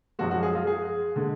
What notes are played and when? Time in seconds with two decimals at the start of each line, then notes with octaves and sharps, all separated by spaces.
0.19 F#2 F3 G#3 F#4
0.31 F#4
0.43 G#4
0.55 F4
0.67 G#4
1.16 D3 G#3